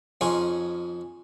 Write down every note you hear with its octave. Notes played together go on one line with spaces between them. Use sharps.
F2 F3 C#4 D#4 G#4 C6